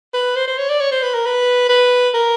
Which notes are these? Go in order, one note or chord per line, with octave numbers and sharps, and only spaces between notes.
B4
C5
C5
C#5
D5
C#5
C5
B4
A#4
B4
B4
A#4